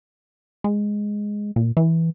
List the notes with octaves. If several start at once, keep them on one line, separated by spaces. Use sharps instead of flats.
G#3
A#2
E3